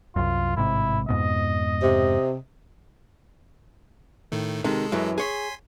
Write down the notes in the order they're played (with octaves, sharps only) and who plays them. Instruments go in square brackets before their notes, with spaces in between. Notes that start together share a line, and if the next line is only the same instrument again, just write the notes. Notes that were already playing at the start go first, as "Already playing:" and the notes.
[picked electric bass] C2 F#2 [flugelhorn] F4
[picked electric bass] A1 G#2 C3 [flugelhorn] E4
[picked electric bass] F2 G#2 B2 [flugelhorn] D#5
[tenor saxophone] C3
[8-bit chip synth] A2 D#3 A3
[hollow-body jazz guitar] C3 D#3 [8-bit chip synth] G#3 A4
[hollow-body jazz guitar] F#2 E3 F#3
[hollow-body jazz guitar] G#4 C#5 [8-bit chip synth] G#5 C6 B6